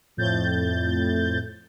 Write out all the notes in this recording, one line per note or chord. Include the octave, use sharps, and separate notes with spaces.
F2 A2 G6 A6